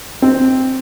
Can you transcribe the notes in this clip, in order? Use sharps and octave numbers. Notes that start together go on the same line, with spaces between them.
C4